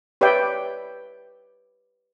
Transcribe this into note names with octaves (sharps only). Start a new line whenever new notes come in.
G4 B4 C#5 D5 E5 G5